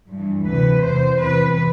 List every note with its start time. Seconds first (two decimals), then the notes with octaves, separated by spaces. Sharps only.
0.09 G2 E3
0.47 D2 C3 E3 B4
0.84 E2 C3 E3 C5
1.21 E2 C3 E3 B4